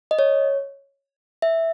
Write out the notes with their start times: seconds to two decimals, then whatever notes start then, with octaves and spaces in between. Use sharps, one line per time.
0.11 D#5
0.19 C#5
1.42 E5